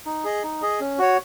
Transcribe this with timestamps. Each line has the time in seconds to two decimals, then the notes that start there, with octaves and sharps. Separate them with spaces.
0.06 D#4
0.24 G#4 D#5
0.44 D#4
0.62 G#4 D#5
0.81 C#4
0.99 F#4 C#5